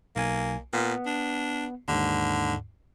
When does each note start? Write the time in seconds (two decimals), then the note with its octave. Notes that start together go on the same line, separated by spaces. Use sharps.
0.16 B1 A#3 G#5
0.73 A#2 B3
1.06 D4
1.88 D#2 G#2 D3